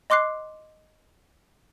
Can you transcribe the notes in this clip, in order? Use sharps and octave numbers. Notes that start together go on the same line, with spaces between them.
D#5 C6 D6 F#6 C7